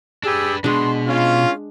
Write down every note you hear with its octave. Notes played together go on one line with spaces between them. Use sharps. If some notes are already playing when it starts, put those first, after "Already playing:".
D4 G4 G#4 B4 E6
B2 G#3 D4 C6
C#4 F4